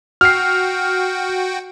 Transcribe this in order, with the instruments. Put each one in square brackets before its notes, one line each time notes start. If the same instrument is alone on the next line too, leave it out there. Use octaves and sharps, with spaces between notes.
[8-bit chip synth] F#4 G5 [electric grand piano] F6 C7